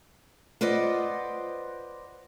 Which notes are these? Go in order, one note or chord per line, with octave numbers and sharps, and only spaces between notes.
F4 B4 C5 D5 D#5 F#5